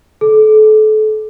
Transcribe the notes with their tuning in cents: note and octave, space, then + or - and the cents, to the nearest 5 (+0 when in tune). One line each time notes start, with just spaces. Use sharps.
A4 -30